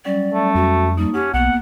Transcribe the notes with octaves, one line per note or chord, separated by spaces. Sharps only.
F#3 G3 C#4 D5
A3
F2 F#4
G3 A#3 D#4
C#4 G4 F#5
B1 A#3 B3 F#5